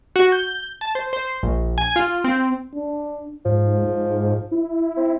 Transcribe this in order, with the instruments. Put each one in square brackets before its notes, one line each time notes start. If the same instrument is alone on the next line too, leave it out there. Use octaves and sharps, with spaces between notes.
[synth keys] F#4
G6
A5
C5
C5
A#1
G#5
F4
C4
[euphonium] D4
[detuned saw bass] G#2 [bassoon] F3
[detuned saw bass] G#2
E4
[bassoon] C4